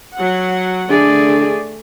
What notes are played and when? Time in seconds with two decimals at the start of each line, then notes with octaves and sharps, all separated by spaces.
0.16 F#3 F#5
0.90 D3 A3 G#4 D5